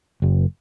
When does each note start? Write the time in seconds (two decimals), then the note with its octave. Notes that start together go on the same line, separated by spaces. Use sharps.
0.22 F#1